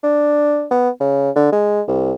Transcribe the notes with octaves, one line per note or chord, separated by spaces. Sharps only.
D4
B3
C#3
D3
G#3
C2